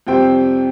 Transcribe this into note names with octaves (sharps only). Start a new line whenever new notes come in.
F2 C3 G3 C4 G5